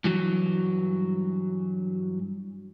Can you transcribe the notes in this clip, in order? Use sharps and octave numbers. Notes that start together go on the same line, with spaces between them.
G2 E3 F#3